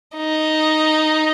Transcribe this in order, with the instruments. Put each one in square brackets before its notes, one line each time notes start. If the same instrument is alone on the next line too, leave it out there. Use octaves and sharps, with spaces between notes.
[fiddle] D#4